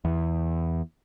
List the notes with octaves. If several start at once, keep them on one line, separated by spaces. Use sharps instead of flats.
E2